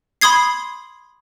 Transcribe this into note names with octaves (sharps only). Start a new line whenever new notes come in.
B5 C6 D#6 G#6 C7